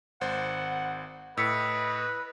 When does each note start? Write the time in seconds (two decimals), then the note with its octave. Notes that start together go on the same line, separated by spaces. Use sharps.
0.21 G#1 C5 F#5
1.37 A2 B4 D#5 E6 B6 C#7